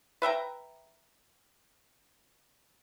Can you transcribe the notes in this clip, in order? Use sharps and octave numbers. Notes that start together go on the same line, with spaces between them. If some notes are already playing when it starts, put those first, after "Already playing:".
B4 E5 G5 A#5